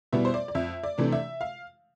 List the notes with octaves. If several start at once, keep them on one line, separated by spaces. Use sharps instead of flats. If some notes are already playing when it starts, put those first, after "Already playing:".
B2 G3 B3 E4 E5
C5
D5
D5
F2 E5
D5
C3 E3 A3 D4
E5
F5